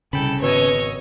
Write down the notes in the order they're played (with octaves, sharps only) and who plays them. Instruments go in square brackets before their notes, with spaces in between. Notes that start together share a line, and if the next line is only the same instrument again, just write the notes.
[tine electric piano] C2 G5 B5 [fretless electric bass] C#3 [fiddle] A4
[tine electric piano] G#1 B2 E6 [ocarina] B4 [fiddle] C#5 D#5